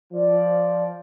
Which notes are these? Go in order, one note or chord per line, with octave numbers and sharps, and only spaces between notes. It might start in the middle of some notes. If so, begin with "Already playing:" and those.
F3 D5